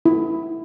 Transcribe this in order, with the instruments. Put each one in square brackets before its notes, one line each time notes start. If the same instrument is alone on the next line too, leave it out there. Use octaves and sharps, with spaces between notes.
[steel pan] E4